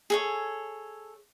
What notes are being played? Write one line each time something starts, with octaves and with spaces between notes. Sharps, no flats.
G#4 A4 C#5